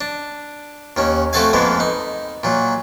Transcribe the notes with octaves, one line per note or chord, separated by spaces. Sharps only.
D4
D#2 D#3 C#4
A3 C4 F#4 A4 F5 G#5
F2 D3 G#3 A#3 B3
D#4
A#2 F#3